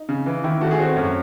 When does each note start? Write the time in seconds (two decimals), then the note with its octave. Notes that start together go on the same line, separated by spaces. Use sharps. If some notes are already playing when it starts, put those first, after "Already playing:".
Already playing: D#4
0.09 C#3
0.26 E3
0.44 D#3 E4
0.61 A3 F#4
0.71 G#4
0.80 C4 F#4
0.96 F#2 C#5